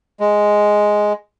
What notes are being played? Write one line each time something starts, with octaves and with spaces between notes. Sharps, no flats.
G#3